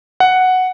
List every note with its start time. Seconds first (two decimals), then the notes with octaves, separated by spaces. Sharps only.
0.20 F#5